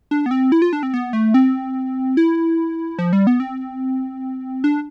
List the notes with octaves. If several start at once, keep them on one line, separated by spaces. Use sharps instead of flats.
D4
B3
C4
E4
F4
D4
C4
B3
A3
C4
E4
F3
G3
B3
C4
D4